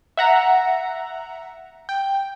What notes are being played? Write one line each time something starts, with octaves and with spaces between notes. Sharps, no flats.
E5 F#5 A#5
G5